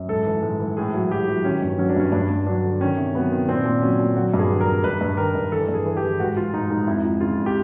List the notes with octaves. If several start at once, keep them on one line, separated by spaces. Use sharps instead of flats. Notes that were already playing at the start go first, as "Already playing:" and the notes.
Already playing: F#2
G#2 A4
E3
G#2
E3
A2 G#4
F#3
F#3 G4
F#3
D#3 C#4
G2
F#3 C#4
D4
G2 C#4
G2 D4
G2
F#3 D4
D3
D#3 C#4
C3
F#3 B3
D#3
A#2 C4
A#2
F#3 C#4
A#2
F#3 F#4
G2
G#4
D#3
A#4
G2
G2 B4
G2
D#3 A#4
G2
E3 A4
G2
G#4
E3
G4
E3
G#2 F#4
F3 F4
G#2 D#4
G#2 D#4
F2 E4
F3
C#3 F4
F2
G4